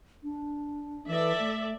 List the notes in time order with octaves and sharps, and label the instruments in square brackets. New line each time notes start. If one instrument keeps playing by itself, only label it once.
[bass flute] D4
[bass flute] E3 [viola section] A4 D5 E5
[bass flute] A3